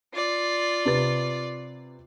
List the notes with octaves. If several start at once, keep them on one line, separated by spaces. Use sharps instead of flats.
F4 D5
C3 B4 A6